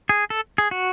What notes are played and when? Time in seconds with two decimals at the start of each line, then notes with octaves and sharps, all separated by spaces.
0.09 G#4
0.30 A4
0.58 G#4
0.71 F#4